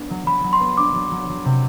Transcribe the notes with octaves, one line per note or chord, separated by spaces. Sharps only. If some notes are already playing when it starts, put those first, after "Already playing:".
Already playing: B3 D4
F#3
F#3 B5
F#3
C6
B3
D4 D6
F#3
F#3
F#3
C3